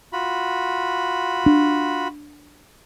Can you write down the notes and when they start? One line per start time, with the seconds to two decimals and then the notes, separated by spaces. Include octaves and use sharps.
0.13 F4 F#4 B5
1.46 D4